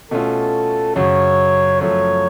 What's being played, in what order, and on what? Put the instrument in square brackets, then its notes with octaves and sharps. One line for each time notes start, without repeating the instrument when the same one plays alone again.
[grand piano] B2 A3 C#4 F4 [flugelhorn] A4
[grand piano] F#2 C#3 F#3 [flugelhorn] C#5
[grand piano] F#2 F3 A3 [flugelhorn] C#5